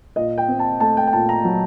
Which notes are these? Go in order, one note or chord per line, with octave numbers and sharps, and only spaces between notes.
A#2 D#5
G5
C4
A5
A3 A5
G5
G5
A#2 A5
A#5
F#3